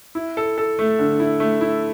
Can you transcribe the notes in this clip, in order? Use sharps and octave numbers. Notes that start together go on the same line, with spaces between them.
E4
A4
A4
A3
D3
E4
A3
E4